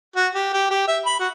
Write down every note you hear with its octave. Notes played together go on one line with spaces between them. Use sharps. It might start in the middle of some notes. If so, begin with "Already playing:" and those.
F#4
G4
G4
G4
E5
B5
F#4